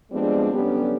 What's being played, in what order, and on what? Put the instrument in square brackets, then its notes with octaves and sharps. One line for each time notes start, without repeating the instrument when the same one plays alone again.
[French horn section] F3 G3 G#3 B3 C4 D4
D3 F#3 G3 B3 C#4 G4